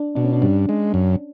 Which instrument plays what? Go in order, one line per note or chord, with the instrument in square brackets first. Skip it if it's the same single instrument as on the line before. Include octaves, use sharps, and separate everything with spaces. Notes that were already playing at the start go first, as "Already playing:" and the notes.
Already playing: [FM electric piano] D4
[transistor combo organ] B2 [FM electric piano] D4
[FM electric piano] C#4
D4
[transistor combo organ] G2
G#3
F#2